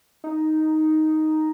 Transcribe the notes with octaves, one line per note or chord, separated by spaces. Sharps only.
D#4